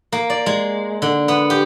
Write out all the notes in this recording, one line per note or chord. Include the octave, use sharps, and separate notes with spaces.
A#3
D5
G#3
D3
B3
G4